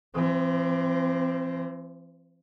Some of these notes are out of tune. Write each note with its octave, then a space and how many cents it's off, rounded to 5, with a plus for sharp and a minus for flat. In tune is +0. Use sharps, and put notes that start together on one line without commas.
E3 +45 C4 +0